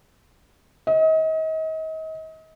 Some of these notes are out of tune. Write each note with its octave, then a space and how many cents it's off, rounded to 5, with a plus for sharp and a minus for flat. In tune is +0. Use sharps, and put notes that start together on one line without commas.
D#5 +35